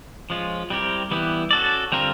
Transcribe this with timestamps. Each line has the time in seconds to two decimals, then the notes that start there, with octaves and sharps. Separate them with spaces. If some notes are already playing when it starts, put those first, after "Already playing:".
0.30 F3 G#3 C#4 F4
0.70 G3 C4 E4 G4 A#4
1.11 E3 G3 B3 E4 G4
1.51 C#4 F#4 A4 D5
1.92 D3 G3 C4 F4 A#4